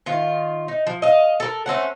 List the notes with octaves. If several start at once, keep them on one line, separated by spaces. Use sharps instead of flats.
D#3 F4
D#4
F3
D#5 F5
A4 A#4
A3 C4 C#4 F#5